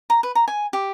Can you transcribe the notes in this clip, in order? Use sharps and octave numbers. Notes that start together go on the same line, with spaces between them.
A#5
B4
A#5
G#5
G4